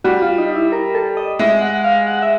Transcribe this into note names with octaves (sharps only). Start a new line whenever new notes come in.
G3 F#4
F4
D#4
E4
A#4
A4
D#5
G#3 E5
F#5
F5
F#5
E5